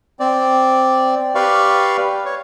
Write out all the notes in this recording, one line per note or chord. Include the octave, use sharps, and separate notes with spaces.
C4 D5
G4 B4 D5 F5 C#6
C#5